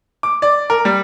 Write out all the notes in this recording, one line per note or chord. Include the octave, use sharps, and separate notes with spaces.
D6
D5
A#4
G3